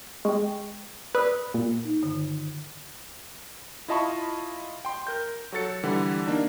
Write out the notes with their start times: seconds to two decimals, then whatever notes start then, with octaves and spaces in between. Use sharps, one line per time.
0.25 G#3 G5 C#6
1.15 B4 D5 D#6 E6
1.54 A#2
1.85 D#4
2.02 G2 D3 D#3
3.88 E4 F4 D#5 A5 B5 C#6
4.85 G5 C6
5.07 A#4 G6
5.52 F#3 F#4 A4 A6 C#7
5.83 D3 E3 G3 F#5
6.27 A#3 D4 D#4